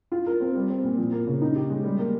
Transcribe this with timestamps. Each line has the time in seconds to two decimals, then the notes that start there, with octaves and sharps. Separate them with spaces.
0.12 F4
0.26 A#4
0.40 C4
0.55 G3
0.70 C4
0.84 A#2
0.98 F3
1.12 A#3
1.27 C#3
1.42 D#4
1.56 G4
1.70 G#3
1.84 G3
1.99 A#3